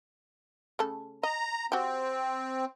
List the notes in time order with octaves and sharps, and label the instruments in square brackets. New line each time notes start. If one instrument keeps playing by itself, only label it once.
[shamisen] C#3 A3 A4
[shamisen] D#5 [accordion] A#5
[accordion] C4 [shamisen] F#4 G4